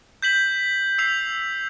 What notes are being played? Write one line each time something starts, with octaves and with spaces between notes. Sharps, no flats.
G6 B6 F#7
E6 C7 F7